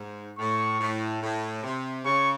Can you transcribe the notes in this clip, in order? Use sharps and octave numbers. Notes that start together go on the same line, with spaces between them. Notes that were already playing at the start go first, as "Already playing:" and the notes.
Already playing: G#2
A2 C#6
A2
A2
C3
C#3 C#6